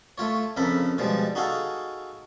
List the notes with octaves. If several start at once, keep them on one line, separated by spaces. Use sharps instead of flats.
A3 F4 C#5
F2 C#3 A4 A#4 B5
B2 F3 G3 G#3
D#4 F#4 G#4 A4 F5